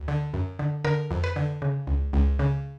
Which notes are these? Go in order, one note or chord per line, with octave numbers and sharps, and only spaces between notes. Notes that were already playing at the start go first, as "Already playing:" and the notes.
Already playing: D2
D3
F#2
D3
D3 A#4
F2
B4
D3
C#3
C#2
C#2
C#3